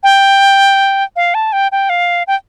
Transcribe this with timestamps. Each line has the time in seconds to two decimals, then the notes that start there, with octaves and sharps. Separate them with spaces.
0.03 G5
1.16 F5
1.34 A5
1.53 G5
1.72 G5
1.89 F5
2.27 G5